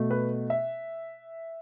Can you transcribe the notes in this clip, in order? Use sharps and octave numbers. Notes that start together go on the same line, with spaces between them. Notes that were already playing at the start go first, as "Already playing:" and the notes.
Already playing: B2 A3
B4
E5